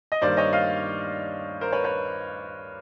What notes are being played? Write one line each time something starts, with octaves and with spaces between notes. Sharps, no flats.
D#5
G2 D#3 G3 A#3 C5 D5
C#5 D#5
D#5 F5
A#4 C5
B4 C#5
B4 C#5